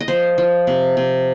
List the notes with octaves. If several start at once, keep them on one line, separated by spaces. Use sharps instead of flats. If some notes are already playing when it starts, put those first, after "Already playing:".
D#5
F3 C5
F3
C3
C3